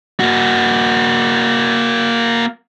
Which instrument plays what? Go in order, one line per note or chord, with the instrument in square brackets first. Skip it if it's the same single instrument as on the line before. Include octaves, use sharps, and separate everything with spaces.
[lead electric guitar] A#3 F#4